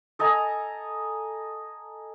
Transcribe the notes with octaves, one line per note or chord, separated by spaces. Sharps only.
A4 D#5 G#5 A#5